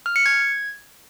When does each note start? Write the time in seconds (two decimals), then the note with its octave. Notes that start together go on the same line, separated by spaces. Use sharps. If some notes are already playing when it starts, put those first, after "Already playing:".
0.06 F6
0.16 C#7
0.26 G#6